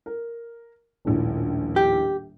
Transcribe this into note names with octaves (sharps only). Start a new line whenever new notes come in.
A#4
D#1 A#1 A2
G4